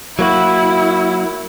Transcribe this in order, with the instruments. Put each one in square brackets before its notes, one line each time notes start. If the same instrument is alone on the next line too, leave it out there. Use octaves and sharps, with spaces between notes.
[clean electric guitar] F#3 A#3 F#4 [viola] E4